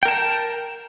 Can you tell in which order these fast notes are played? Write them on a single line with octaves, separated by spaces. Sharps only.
G5 A#4 A5 A#5